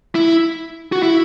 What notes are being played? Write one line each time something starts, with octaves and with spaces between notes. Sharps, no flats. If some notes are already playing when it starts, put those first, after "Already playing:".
E4
F#4
E4